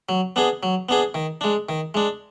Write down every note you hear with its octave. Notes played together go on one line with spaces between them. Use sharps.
F#3
B3 D4 G#4
F#3
B3 D4 G#4
D#3
G#3 D4
D#3
G#3 D4